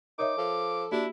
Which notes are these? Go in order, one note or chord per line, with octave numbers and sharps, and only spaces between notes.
D#4 A#4 C#5 E5 D6
F3 A4
A#3 D4 E4 F#4 G4